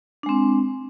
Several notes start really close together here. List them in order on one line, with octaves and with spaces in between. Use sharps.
D4 G#3 C4